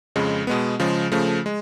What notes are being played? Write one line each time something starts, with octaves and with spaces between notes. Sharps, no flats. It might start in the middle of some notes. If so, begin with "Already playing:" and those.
F2 C#3 G#3
B2 G#3 B3
C#3 F3 G#3
C#3 F3 A3
G#3